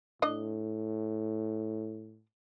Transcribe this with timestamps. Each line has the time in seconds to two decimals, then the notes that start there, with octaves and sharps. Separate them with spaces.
0.22 A2 D4 D#5